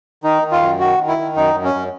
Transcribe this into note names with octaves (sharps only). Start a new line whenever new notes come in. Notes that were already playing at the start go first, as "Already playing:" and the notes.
D#3 D#4
D#3
F4
F#2
D#3 F#4
D#3
E4
D#3
F#2 D#4
F#2
C#4
F#2